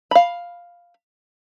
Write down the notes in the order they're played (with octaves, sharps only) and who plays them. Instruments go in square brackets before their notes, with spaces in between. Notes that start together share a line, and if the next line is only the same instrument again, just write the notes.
[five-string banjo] F5 B5